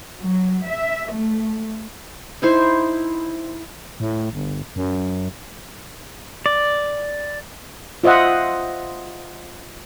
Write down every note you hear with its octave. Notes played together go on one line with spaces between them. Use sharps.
F#3
E5
A3
D#4 E4 C5
A2
G1
F#2
D5
F4 C5 D#5 E5 F#5